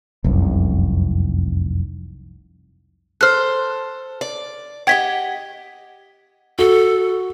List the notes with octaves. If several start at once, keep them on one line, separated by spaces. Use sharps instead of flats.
F1 C2 F#2
A4 C5 F6 F#6
D5
G4 D#5 F#5 G5 G#6 B6
F#4 A4